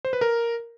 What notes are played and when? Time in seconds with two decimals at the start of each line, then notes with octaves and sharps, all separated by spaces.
0.05 C5
0.13 B4
0.21 A#4